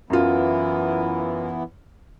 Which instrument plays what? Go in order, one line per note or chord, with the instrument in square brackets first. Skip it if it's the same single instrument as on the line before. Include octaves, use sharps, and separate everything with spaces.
[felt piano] F#2 F4 [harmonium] E3 B3 E4